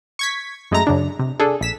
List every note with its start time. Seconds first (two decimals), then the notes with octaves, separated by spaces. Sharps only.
0.19 C#6 G#6 B6
0.71 F#2 G#3 A3 A#5 A#6
0.87 F#2 C#3 D4
1.19 C3
1.40 D4 G#4 A4
1.61 A#1 B6 E7